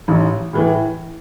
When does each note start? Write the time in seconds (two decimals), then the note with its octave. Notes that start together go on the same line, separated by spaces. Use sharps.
0.08 A1
0.53 A2 E3